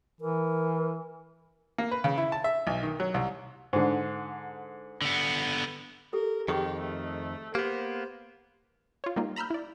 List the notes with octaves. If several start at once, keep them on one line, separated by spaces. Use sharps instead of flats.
E3 A#4
A#3
B4
C#3
E4
A5
E5
B1
D#3
F#3
C2
G#2 D3
D3 B3
G4 A4 A#4
F2 D#3 G4 G#4 C#6
A3
A#3 B3 G4 C5
F4 C#5
G3 A#3 D#4 F4
A#5 B5 E6 F6 G6
E4 D5